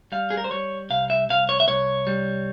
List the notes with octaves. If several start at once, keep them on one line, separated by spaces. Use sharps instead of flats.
G3 F5
G#4
A#4
C5
G3 C#5
C2 F5
E5
C2 F5
C#5
E5
C2 C#5
G3